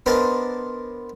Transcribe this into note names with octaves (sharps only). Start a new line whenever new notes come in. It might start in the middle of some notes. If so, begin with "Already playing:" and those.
B3 D4 A#4 C5 D5 D#5